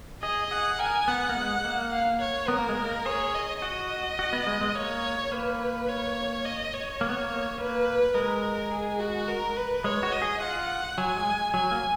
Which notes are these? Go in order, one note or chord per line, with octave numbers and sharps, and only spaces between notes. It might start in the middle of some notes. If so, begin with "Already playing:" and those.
G#4 D#5
G#4 F#5
A#4 G#5
B3 F#5
A#3
G#3
A#3
F5
C#5
B3 A#4
A#3
G#3
A#3
G#4 C#5
D#5
F#4 D#5
F#4
B3
G#3
G#3
A#3 C#5
A#3 B4
C#5
D#5
C#5
A#3
B3
A#3
A#3 B4
G#3 A#4
G#4
F#4
A#4
B4
G#3 C#5
F#4
D#5
G#4
F4 F#5
F#3 G#5
G#3
F#3 G#5
A#3